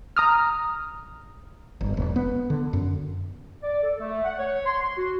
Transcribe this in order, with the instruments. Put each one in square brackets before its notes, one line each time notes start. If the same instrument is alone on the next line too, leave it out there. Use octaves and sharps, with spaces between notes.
[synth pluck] A#5 D#6 F6
[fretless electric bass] G1
E1
B3
D3
F#2
[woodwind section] D5
A4
A3
F#5
C#5
C6
C6
F#4